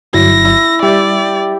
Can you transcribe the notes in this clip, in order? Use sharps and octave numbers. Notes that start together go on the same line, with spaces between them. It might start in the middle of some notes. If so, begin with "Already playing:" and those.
G1 F#3 E4 A#6
E4
G3 G4 D5 E5 A6